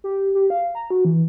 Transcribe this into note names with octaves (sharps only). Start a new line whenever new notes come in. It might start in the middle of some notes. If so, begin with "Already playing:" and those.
G4
G4
F5
A#5
F#4
E3